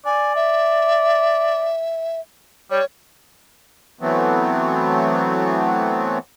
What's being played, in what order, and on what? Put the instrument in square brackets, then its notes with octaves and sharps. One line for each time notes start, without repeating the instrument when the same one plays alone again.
[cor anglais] D5 [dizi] G#5
[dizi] E5
[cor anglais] G3 [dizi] C#5
[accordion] E3 F#3 A3 B3 C4